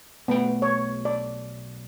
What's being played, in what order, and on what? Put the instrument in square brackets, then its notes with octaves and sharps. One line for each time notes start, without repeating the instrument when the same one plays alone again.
[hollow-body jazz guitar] B1 A3 G5 [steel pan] B3
[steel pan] C#5
D5